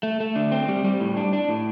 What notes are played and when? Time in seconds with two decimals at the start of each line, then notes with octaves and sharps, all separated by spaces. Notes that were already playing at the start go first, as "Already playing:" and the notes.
0.03 A3
0.20 A3
0.36 D3
0.52 C4
0.68 G3
0.85 G3
1.00 A2
1.17 D4
1.33 D4
1.49 A2